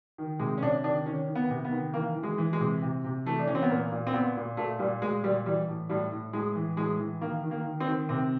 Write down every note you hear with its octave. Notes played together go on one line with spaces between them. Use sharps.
D#3
C3 G#3
C#4
C3 D4
D#3 D4
D#3 C#4
D#3
B3
C3
B3
D#3
E3 A#3
E3
G#3
E3
G#3
C3
C3
C3
E3 A3
D4
E3 C#4
C4
B3
A#2 A#3
A#2
C4
A#2 B3
A#2
A#2 A3
A#2 G3
A#2 G#3
A#2 G3
E3 G3
A2
A2 G3
A2
A2 G#3
E3
A2 G#3
E3
D#3 A#3
D#3
A#3
D#3
C4
D#3
C3 C4